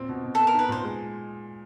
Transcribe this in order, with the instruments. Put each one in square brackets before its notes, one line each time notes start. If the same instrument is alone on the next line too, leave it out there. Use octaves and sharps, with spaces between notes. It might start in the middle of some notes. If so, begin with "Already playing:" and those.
Already playing: [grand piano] A#2 C4
B2
B2
[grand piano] B3 [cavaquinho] A4
[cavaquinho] A#4
[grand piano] D#4
[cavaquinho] B4
[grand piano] A#2 [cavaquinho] C5
[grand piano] G#3